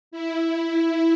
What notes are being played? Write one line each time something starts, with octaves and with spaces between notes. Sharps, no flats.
E4